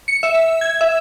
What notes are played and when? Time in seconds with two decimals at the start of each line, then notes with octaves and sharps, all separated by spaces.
0.08 C#7
0.23 E5
0.61 G#6
0.81 E5